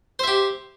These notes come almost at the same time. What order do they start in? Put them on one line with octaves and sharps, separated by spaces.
C5 E5 G4